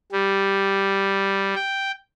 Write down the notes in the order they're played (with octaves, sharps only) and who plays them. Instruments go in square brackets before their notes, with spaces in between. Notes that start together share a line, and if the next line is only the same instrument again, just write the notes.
[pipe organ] G3
G5